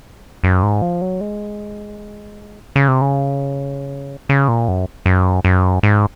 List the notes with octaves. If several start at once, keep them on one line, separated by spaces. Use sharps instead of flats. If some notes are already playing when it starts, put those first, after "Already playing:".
F#2
G#2
F3
F#3
G#3
C#3
C3
C#3
C#3
A#2
F#2
F#2
F#2
G#2